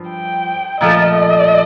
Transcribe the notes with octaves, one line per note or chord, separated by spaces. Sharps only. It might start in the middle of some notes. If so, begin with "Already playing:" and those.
Already playing: G2 F3
G5
A#2 F3 A3 D#5